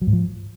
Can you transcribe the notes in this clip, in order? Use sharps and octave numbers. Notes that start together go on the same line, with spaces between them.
F#3
G#2
F3